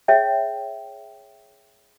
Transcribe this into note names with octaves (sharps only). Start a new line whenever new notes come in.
G#4 C#5 E5 G5